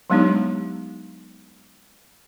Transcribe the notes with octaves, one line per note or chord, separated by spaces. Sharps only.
F#3 G#3 B3 D4 D#4 G4